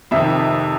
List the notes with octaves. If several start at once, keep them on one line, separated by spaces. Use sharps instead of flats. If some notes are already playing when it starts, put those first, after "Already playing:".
F2 C3 D#3 E5